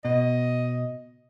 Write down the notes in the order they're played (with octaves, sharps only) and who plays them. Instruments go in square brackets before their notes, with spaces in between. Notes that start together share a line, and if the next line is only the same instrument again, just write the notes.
[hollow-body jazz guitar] B2 [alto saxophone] D#5